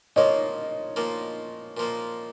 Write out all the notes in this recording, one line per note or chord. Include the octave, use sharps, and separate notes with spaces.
A#2 F3 A#3 C#5 D#5
A#2 F3 A#3
A#2 F3 A#3